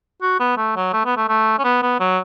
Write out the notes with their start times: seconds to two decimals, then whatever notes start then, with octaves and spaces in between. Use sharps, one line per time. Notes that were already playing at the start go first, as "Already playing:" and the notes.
0.22 F#4
0.40 B3
0.57 A3
0.76 F#3
0.93 A3
1.05 B3
1.17 A3
1.29 A3
1.58 C#4
1.64 B3
1.82 B3
2.00 F#3